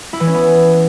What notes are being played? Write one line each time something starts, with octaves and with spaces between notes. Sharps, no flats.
E4
E3
C#4
B3